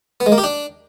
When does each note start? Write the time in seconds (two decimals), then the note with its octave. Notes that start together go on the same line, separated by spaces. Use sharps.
0.20 B3
0.26 G#3
0.32 A#3
0.38 G4
0.44 D4